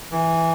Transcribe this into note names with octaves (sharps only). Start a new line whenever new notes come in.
E3